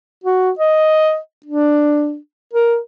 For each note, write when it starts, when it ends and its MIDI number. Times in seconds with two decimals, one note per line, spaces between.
0.24 0.51 66
0.59 1.18 75
1.46 2.17 62
2.54 2.78 70